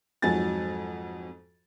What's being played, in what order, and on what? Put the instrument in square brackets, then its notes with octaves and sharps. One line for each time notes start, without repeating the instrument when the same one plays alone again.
[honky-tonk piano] F2 G#2 F#3 F#4 G#5 A6